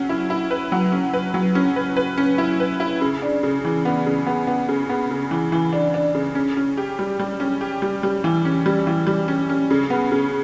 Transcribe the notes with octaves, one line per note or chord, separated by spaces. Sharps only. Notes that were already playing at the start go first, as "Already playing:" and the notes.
Already playing: F#3 C#4
E4
E4
B4
F#3
C#4
B4
F#3
C#4
B4
B4
C#4
E4
B4
E4
C#3
D4
C#3
E3
B3
C#3
B3
B3
C#3
B3
C#3
E3
E3
D4
D4
C#3
C#4
C#4
G4
G3
G3
C#4
G4
G3
G3
E3
C#4
G3
E3
G3
C#4
C#4
C#3
B3
C#3